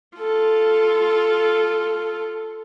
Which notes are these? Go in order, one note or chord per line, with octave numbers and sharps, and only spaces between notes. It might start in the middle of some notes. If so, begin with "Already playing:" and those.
F4 A4